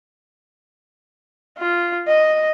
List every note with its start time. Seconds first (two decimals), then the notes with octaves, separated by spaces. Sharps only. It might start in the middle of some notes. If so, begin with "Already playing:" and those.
1.58 F4
2.07 D#5